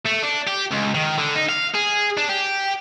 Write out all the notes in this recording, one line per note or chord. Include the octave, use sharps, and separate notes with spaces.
A3
D4
G4
C#2
D#3
D3
D#4
F5
G#4
D4
G4